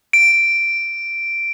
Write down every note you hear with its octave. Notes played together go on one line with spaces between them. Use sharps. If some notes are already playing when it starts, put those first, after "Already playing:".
D7